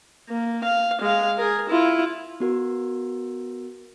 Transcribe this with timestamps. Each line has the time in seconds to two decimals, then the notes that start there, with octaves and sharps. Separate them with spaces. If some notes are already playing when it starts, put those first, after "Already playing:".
0.29 A#3
0.64 F5
1.01 G#3 F5
1.38 G#4 A#4
1.69 E4 F4
2.40 B3 F#4 A#4